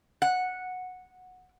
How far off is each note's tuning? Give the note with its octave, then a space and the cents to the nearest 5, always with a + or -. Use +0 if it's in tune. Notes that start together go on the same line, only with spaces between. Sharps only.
F#5 -10